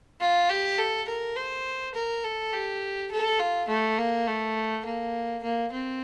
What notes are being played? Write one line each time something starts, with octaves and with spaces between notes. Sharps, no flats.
F4
G4
A4
A#4
C5
A#4
A4
G4
A4
F4
A3
A#3
A3
A#3
A#3
C4